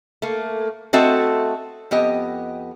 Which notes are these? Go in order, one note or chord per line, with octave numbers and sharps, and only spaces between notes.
A3 A#3
A3 C4 F#4 A4 D#5 E5
F2 B3 G4 D#5